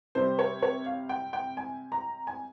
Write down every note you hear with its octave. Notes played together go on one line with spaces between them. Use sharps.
C3 G3 C5
C#5
C#5
F5
G5
G5
G#5
A#5
G#5